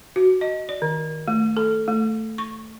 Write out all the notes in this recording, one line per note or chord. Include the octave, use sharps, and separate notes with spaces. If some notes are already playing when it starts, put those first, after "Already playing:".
F#4
D#5
D5
D#3
A3
A4
A3
C#6